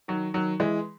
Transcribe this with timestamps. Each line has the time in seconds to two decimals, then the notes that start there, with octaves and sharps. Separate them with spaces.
0.08 D#3 F#3
0.34 D#3 F#3
0.60 E3 G#3